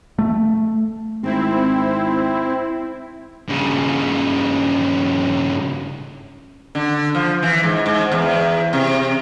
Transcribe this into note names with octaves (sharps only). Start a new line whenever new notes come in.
A3
G#1 C4 E4
G2 C#3
D3
F3
E3
G#2
G#2
E2
C3